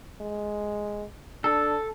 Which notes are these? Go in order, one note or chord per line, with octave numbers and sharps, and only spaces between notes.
G#3
D4 A4